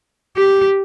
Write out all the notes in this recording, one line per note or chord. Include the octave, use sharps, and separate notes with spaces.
G4